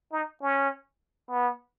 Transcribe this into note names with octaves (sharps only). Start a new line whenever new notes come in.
D#4
C#4
B3